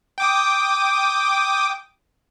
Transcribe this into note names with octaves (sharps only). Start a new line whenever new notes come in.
G5 D6 D#6